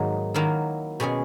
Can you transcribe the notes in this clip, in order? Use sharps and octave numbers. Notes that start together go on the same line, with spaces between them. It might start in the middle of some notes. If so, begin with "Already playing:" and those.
Already playing: G#2 D#3 F#3 A#3 D#4
D#3 F#3 A#3 E4 A#4
B2 G#3 C#4 G#4